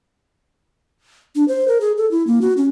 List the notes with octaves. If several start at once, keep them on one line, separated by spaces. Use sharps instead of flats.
D4
C5
A#4
G#4
A4
E4
A#3
F#4
C#4